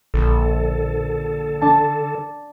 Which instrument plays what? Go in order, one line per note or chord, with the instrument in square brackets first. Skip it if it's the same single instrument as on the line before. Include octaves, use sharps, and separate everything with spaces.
[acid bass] A#1 [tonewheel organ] D3 A4
[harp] D4 A5